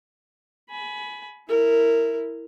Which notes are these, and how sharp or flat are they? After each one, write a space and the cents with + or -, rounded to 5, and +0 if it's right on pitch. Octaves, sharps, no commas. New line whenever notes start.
G#5 +25 B5 +0
E4 +0 A#4 -15